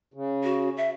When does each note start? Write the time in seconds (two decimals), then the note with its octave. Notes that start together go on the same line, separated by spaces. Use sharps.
0.14 C#3
0.44 F#4
0.77 E5